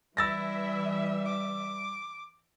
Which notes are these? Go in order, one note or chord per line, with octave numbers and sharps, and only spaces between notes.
E3 G3 E4 E5 E6 A6 A#6
D6